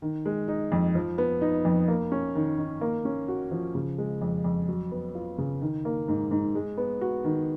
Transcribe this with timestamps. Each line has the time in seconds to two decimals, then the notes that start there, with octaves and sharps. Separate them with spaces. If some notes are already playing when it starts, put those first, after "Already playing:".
0.02 D#3
0.26 G#3
0.48 D#4
0.72 F2
0.95 F3
1.18 B3
1.41 D#4
1.65 F2
1.88 A#3
2.12 C#4
2.35 D#3
2.58 D#3
2.81 A#3
3.05 C#4
3.28 F#4
3.51 F3
3.75 C#3
3.98 G#3
4.21 F2
4.44 F2
4.68 F#3
4.91 B3
5.15 F4
5.38 C#3
5.61 D#3
5.85 A#3
6.08 G#2
6.31 G#2
6.55 G#3
6.77 B3
7.01 F#4
7.24 D#3